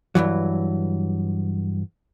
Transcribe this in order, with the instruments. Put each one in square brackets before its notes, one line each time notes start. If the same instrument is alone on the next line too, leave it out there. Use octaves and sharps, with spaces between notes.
[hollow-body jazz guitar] G2 C3 E3 F#3